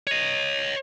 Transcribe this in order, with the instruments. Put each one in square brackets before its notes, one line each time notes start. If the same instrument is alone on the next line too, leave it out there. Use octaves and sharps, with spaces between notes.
[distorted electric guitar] C#5 D#5